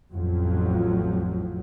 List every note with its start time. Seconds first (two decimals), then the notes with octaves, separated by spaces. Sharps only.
0.13 A1 F2 F3 F#3